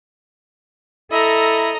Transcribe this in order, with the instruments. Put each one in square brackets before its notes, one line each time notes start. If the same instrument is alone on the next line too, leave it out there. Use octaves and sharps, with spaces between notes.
[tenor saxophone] E4 [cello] A4 [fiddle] D#5 A#5